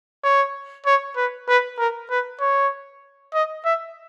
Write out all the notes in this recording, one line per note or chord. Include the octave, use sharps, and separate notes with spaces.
C#5
C#5
B4
B4
A#4
B4
C#5
D#5
E5